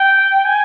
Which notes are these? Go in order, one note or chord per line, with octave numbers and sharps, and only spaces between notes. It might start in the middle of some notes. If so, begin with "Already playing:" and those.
Already playing: G5
G#5